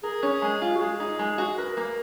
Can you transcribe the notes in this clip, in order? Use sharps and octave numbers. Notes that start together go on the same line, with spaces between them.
G#4 A#4
C#4
G#3
F4
F#4
G#3 G#4
D#4
G#3
F#4
A#4 B4
A#3